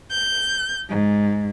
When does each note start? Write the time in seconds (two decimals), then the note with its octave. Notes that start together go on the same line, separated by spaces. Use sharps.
0.11 G6
0.88 G#2